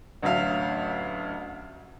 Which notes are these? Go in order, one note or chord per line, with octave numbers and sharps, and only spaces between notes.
A1 D2 F#3 E5 F5 F7